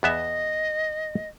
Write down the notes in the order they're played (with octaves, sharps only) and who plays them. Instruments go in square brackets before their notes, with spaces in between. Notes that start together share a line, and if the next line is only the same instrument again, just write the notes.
[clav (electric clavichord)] E2 B3 E5 [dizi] D#5